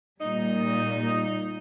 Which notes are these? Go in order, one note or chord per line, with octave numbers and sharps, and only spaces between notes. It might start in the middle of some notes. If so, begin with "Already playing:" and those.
A#2 G3 D#4